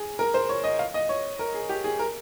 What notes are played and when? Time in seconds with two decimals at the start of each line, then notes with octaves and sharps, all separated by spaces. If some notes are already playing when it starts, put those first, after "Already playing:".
Already playing: G#4
0.19 A#4
0.34 C5
0.49 C#5
0.64 D#5
0.79 F5
0.94 D#5
1.09 C#5
1.39 A#4
1.54 G#4
1.69 G4
1.84 G#4
1.99 A#4